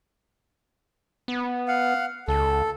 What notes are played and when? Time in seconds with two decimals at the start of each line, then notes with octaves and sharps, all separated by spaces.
1.28 B3
1.68 F5 F#5
2.28 C#2 A4